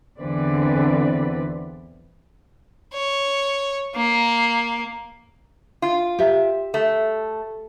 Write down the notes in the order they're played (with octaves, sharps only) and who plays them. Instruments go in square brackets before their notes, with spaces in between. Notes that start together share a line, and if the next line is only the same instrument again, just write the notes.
[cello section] E2 D3 E3 C4 B4 D5
[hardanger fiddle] C#5
A#3
[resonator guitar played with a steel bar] F4
[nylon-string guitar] G4 E5
[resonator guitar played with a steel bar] A3